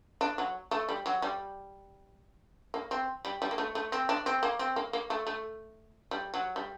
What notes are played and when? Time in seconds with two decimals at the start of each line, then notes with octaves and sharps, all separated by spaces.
0.21 D4
0.38 F#3
0.71 A3
0.89 G3
1.06 F#3
1.22 G3
2.74 A#3
2.91 C4
3.25 G3
3.42 G3
3.51 A#3
3.58 A3
3.75 A3
3.92 C4
4.09 D4
4.26 C4
4.43 A#3
4.59 C4
4.76 A#3
4.93 A#3
5.10 A3
5.27 A3
6.11 G3
6.34 F#3
6.56 G3